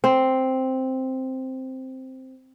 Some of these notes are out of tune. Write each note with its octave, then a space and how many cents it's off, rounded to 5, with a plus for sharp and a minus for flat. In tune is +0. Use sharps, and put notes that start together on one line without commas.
C4 +0